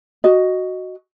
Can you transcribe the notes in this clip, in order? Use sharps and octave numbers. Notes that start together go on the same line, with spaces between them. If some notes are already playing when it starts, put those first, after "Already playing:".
F#4 D#5